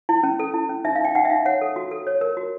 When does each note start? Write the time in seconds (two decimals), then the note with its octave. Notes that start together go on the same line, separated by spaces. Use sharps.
0.09 E4
0.23 C#4
0.39 A4
0.54 E4
0.69 C#4
0.85 D#4 E5
0.95 F5
1.00 D#4 G5
1.15 D#4 F#5
1.25 E5
1.30 D#4 F5
1.46 C#5 F#5
1.61 A4
1.76 F#4
1.91 A4
2.07 C#5
2.21 A#4
2.37 F#4